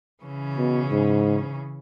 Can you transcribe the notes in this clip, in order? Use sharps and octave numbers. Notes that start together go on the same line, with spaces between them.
C#3 E3 C#4
B2
G#2